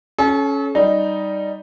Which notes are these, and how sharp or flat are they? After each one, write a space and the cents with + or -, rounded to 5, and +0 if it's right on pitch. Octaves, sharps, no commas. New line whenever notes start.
C#4 +0 A4 -40
G3 +0 D#4 +0